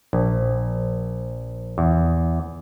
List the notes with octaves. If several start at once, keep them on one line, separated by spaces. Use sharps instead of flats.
A#1
E2